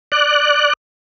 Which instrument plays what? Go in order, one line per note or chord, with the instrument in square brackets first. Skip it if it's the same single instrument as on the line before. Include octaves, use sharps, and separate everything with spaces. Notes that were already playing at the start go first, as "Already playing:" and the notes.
[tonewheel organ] D5 F#6